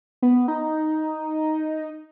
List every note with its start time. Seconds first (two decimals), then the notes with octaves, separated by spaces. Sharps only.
0.22 B3
0.48 D#4